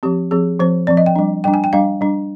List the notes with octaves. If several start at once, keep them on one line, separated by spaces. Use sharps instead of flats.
F3 C4 G4
F3 C4 G#4
F3 C4 C5
F3 C4 D5
D#5
G5
G3 D4
G3 D4 G5
G#5
G5
G3 D4 F5
G3 D4